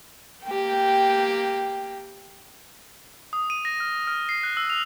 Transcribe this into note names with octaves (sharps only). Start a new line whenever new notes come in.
A#3 G4 G5
D#6
D#7
A#6
F6
F6
C7
F#6
E6
F7